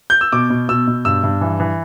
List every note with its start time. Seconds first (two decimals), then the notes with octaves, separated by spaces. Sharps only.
0.10 G6
0.21 E6
0.32 B2 D6
0.50 B2
0.69 B2 E6
0.87 B2
1.05 G2 E6
1.24 G2
1.41 E3
1.60 E3